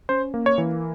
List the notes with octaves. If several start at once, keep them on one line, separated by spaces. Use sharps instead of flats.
C#4 C5
A#3
C#5
E3